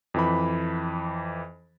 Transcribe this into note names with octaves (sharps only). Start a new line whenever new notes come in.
F2 E3 B5